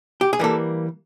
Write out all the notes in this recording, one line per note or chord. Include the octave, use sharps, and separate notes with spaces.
G4
G#4
E3 G3 A#3 A4